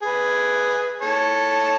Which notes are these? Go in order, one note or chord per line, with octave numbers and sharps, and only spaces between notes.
G#4 B4
A4 C#5